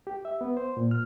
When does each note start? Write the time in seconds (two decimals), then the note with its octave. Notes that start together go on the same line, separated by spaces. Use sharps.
0.07 G4
0.25 E5
0.41 B3
0.57 C5
0.77 A#2
0.91 F6